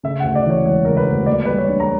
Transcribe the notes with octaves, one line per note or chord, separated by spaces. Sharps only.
C#3 E5
F#5
D2
D5
E3 C#5
E1 C#5
C#3 A#4
B4
D2
A#3 D5
G3 B4
C#5
D4
A#5